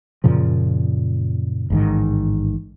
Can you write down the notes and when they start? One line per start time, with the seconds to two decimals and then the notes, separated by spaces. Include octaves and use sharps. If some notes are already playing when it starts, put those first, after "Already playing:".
0.24 F#2 A#2 C#3 F3
1.70 A1 G#2 D#3